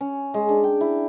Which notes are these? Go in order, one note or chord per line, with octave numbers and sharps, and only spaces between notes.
C#4
G#3
D4
G5
E4